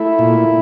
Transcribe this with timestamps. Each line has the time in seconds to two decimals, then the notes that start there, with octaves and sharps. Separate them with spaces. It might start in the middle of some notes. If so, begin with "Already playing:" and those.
Already playing: A3 E4
0.19 A#2